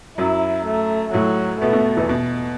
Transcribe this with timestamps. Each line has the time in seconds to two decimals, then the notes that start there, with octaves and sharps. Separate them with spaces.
0.18 F#2 F#3 E4
0.65 A3
1.13 A2 F#3 A3
1.61 B2 A3 B3
1.73 B2 B3
1.97 E2 E3
2.09 B2